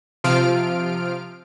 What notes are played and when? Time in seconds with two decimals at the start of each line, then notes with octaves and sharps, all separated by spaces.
0.24 C3 F3 F4 F6 D7